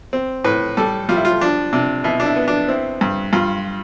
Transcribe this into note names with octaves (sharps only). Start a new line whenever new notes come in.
C4
A2 B4
G3 A4
G3 F4
E4
F4
F3 D4
C3 D4
B2 E4
D4
E4
B3
D4
C4 E4
G2
G2 F4